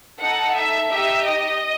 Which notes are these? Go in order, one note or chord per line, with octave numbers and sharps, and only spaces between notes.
D#4 A4 F#5
E5
D#4 G4 E5
D#5